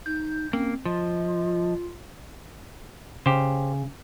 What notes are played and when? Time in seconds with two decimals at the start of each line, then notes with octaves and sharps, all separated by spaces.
0.06 D#4 G6
0.53 A#3 C4 C#4
0.85 F3 F4 D#5
3.26 C#3 G4 C5